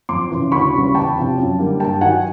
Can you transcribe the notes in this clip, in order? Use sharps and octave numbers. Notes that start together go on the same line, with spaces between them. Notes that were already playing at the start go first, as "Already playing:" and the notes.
F2 C6 D6
C#3 E3
D2 B5 C#6
C#3 E3 G3 B3
E2 G5 A5
C3 F3
F#2
D3 G3 A#3
G2 G5 A5
D#3 F#3 F#5 G#5